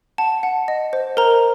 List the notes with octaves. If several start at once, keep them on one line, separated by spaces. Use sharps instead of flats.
F#5 A5
F#5
D#5
C5
A#4 C5 A#5